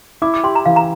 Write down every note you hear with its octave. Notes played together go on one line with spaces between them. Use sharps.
E4 D6
D6
G4 C6
A#5
E3 F5
A#5